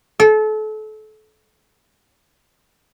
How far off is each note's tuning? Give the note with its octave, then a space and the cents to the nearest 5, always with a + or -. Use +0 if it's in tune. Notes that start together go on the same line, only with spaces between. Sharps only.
A4 -30